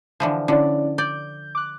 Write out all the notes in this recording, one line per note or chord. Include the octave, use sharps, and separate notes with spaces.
D3 E3 F3
D3 C#4 E4 D5
D5 G6
D6 F#6